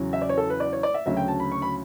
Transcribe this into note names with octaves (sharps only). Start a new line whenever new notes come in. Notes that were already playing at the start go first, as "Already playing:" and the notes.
Already playing: E2 C#3 F#3
E5
D5
C#5
A4
B4
D5
C#5
D5
E5
D2 C#3 F#3 E5
G5
A5
B5
C#6
B5